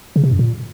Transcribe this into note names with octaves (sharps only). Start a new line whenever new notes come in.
C#3
C3
F#2
A#2